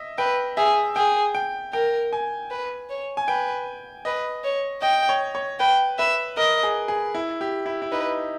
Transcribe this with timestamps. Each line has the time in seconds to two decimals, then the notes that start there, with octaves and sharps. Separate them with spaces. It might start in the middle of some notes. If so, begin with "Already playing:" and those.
Already playing: D#5 E5
0.18 B4 G5
0.57 G#4 E5
0.96 G#4 G5
1.35 G5
1.73 A#4 G5
2.13 G#5
2.50 B4
2.90 C#5
3.17 G#5
3.28 B4 G5
4.05 B4 D#5
4.44 C#5
4.82 D#5 G5
5.09 C#5
5.35 C#5
5.59 B4 G5
5.99 B4 E5
6.37 A#4 D#5
6.63 G#4
6.88 G#4
7.14 E4
7.41 G4
7.66 E4
7.82 E4
7.92 D#4 B4